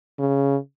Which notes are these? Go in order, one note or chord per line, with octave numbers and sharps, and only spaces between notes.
C#3